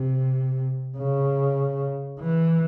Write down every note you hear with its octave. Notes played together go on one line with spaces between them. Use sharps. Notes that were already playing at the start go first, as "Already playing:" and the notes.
Already playing: C3
C#3
E3